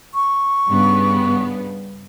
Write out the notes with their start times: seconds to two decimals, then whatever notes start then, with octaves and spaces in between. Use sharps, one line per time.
0.14 C#6
0.68 G2 C#3 B3